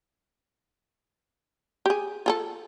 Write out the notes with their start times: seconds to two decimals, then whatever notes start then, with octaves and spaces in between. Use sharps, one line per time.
1.86 G4 G#4
2.26 F4 G#4 A4